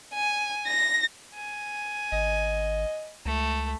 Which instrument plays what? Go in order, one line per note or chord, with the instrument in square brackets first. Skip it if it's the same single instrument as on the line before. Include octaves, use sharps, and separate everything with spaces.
[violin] G#5
A#6
[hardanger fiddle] G#5
[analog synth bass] G#1 [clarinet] D#5
[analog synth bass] C#2 [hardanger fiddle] A3